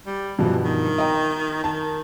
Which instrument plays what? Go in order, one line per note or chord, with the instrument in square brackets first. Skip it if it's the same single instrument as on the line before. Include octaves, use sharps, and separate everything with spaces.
[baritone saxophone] G3
[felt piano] G2 B2 F3 [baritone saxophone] E3
[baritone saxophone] D#3
[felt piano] D#5 G5 A#5
[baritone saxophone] D#3 [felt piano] A5